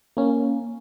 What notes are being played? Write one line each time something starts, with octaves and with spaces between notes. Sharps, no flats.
A#3 C#4